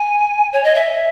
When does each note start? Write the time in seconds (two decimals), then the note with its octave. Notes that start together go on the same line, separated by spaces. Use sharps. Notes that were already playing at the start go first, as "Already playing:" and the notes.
Already playing: G#5
0.53 C#5
0.64 D#5
0.75 E5